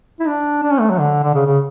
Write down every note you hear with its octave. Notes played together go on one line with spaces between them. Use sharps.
E4
D4
D4
C#4
A3
F#3
D3
D3
C#3
C#3